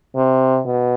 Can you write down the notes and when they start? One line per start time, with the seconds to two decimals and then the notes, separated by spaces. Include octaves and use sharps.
0.16 C3
0.65 B2